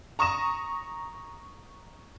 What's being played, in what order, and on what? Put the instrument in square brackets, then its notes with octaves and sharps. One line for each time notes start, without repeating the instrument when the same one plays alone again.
[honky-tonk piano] A#5 C#6 D#6 A#6 E7